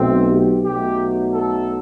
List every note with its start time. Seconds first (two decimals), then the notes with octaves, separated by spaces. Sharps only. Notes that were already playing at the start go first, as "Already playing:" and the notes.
Already playing: B1 B2 A3 C4
0.30 G4
0.64 B1 B2 F#3 A3 G4
1.33 A4